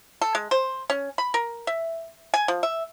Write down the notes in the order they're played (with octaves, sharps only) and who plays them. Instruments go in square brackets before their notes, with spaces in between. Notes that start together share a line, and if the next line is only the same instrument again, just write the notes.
[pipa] A4
G#3
C5
C#4
B5
A#4
E5
G#5
F3
E5